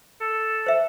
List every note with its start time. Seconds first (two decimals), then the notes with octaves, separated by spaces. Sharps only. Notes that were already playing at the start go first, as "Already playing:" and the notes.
0.21 A4
0.66 C5 E5